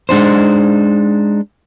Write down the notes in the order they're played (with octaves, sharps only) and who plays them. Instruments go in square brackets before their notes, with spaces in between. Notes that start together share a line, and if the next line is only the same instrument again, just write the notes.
[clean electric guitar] G#3 D4 D#4 C5